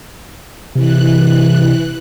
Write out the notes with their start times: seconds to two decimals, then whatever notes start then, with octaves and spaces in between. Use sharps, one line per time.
0.75 C3 E3 F#6